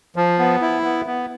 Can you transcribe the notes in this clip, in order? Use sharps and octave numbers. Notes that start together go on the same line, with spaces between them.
F3
B3
E4
B3
B3